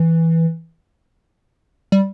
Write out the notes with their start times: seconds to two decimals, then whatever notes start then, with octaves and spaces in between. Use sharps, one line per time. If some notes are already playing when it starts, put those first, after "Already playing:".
Already playing: E3
1.92 G3